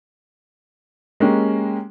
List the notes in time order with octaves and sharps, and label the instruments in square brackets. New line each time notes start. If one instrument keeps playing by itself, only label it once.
[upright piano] G#3 A#3 C#4 G4